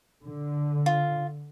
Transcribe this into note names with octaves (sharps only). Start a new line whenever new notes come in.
D3
F4